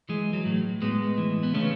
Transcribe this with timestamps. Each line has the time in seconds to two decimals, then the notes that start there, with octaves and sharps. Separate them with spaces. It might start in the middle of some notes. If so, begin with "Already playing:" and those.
0.09 E3 G#3
0.33 F#3
0.45 A2
0.82 A2 G#3 B3
1.18 E3
1.43 B3
1.54 C#3 A3 C#4